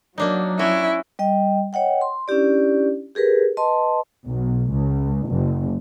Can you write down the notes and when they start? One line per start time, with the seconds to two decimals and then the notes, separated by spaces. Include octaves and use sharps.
0.18 F#3 A#3 D4 D#4
0.59 C#4 E4 F#4
1.19 G3 D#5 G5
1.73 C#5 D#5 F#5 G5
2.01 C6
2.28 C#4 D4 E4 G4 D5
3.15 G4 G#4 A#4 B4
3.57 B4 D#5 A5 C6
4.25 B1
4.71 C#2
5.29 F#1